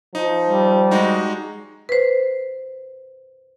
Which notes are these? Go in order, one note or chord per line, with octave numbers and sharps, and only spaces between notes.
F3 D#4
G3
G#3 D#4 F#4
B4 C5